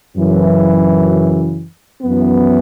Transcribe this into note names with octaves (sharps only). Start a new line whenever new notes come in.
F#2 C#3 E3
F#2 E3 B3